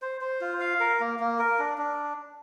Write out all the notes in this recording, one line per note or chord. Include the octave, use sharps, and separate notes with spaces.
C5
C5
F4
F5
A#4
A#3
A#3
A#4
D4
D4